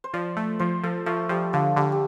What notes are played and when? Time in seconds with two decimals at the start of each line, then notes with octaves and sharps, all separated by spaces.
0.04 C5
0.14 F3 D5
0.37 A3
0.59 F3 C5
0.84 F3 A4
1.06 F3 A3
1.29 F3 G3
1.53 D3 F3
1.76 D3 G3
1.92 G3